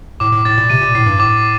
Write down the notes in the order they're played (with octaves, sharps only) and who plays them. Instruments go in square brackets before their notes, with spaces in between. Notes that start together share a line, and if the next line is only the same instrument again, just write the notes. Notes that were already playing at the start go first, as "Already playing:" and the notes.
[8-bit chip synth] A2 [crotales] D6
[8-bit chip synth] A2
[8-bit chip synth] A2 [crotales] A6
[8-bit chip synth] A#2
[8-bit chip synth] C3 [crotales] D#7
[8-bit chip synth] A#2
[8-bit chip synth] A2 [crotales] C7
[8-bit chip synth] G2
[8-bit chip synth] A2 [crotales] D6